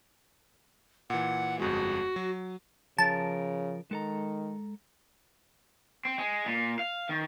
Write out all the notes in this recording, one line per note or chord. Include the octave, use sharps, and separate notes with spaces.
A#2 E3 F#5
G1 F2 G#3 F#4
F#3
C#3 F3 A#4 A5
D#3 G#3 A4 A#5
C4
G#3
A#2
F5
D#3